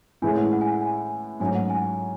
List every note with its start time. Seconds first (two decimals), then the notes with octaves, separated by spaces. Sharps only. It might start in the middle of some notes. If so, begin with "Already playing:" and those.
0.22 A2 E3 G#3 C#4 E4 G#5
0.37 F#5
0.53 F#5
0.61 G#5
0.72 F#5
0.81 G#5
1.40 G#2 F#3 A3 C#4 G#5
1.55 F#5
1.70 G#5